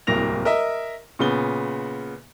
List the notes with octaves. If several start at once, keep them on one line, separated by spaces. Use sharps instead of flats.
D1 C2 A#3 A#6 F7
A#4 D#5 E5
A#2 C#3 B3 G7